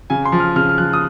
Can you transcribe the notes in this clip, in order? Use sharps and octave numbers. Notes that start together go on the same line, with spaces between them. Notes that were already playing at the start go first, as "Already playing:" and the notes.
C#3 G#5
C6
F3
F6
C#3 F6
F6
F3 F#6
D#6